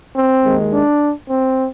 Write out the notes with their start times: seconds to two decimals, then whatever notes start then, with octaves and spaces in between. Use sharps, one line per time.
0.14 C4
0.43 D#2 D#3 G#3
0.71 D4
1.28 C4